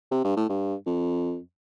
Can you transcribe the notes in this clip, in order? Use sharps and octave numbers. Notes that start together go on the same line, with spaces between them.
C3
G2
A2
G2
F2